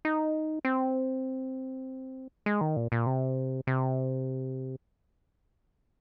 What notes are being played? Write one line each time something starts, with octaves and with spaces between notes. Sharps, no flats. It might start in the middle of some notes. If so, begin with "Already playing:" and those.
D#4
C4
G#3
D#3
A#2
A#2
C3
C3